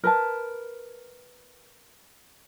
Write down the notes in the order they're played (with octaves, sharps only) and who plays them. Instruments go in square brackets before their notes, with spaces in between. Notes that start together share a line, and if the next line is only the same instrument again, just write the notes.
[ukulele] A#4 B4 A5